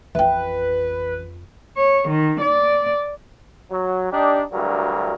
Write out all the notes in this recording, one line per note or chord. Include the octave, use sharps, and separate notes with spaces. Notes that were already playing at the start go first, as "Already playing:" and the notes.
A1 F2 F4 B4 E5 G5
C#5
D#3
D5
F#3
D4 D#4 G4
D2 G2 E3 F#3 G3 A#4